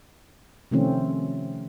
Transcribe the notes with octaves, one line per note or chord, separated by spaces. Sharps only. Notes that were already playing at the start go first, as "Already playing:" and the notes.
C3 D#3 F3 A3 C4 C#4